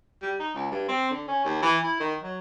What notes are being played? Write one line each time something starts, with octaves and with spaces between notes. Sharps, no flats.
G3
D#4
C#2
G2
C4
D3
C#4
D#2
E3
E4
D#3
F#3